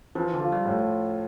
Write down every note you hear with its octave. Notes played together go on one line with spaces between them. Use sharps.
E3 F3
E3
D3
F4
G3
A2